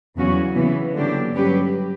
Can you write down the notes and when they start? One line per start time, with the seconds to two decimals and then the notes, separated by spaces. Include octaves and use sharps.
0.16 E2 C#3 F#3 C#4 F#4
0.55 C#3 E3 B3
0.94 D3 F#3 A#3 D4 G4
1.33 G2 F#3 C#4 G4 B4